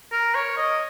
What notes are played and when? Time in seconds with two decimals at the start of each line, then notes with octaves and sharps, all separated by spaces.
0.12 A#4
0.35 C#5
0.57 D#5